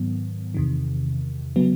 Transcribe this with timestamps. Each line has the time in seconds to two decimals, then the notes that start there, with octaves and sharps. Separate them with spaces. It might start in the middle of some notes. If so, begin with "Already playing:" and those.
Already playing: G#2 D#3 F#3 B3
0.54 E2 C3 D#3
1.56 C#3 F#3 B3